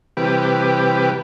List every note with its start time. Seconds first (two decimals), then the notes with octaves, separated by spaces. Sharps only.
0.17 C3 E3 G3 G4 B4